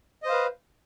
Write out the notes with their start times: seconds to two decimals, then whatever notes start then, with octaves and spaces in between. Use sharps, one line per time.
0.23 D#5
0.26 C5
0.29 F5
0.32 B4